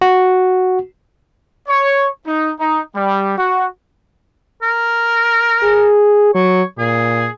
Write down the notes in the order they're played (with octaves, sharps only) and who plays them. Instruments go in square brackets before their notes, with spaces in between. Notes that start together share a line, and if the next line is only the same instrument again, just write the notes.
[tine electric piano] F#4
[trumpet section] C#5
D#4
D#4
G3
F#4
[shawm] A#4
[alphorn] G#4
[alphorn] F#3 [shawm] C#5
[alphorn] A#2 [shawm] G#4